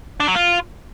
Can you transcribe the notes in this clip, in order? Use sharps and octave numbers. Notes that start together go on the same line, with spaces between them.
D4
F#3
F4